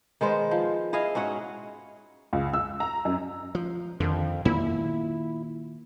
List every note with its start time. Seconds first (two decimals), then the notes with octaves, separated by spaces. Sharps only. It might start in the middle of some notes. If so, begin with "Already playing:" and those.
0.21 D#3 G#3 B3 C5
0.51 F3
0.93 E4 G#4 D#5 F5
1.15 G#2 C#4 F#4 F#5
2.33 C#2
2.53 E6
2.80 A#5
3.05 F#2
3.55 F3
4.00 F2 D3 D#3
4.45 A#2 D#3 A#3 E4